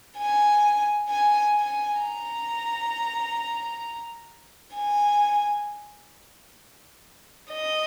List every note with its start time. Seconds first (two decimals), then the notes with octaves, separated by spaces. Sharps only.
0.18 G#5
1.10 G#5
1.56 G#5
2.01 A#5
4.76 G#5
7.51 D#5